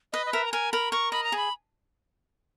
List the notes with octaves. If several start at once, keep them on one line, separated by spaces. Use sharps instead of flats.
B4 D#5
D#5
A#4 E5
A#5
A#4 G#5
A#4 B5
A#4 C#6
D#5 B5
A#5
G#4 B5